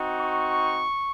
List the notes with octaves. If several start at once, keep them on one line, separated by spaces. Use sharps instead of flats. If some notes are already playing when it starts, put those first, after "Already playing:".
Already playing: C4 D#4 F#4
C#6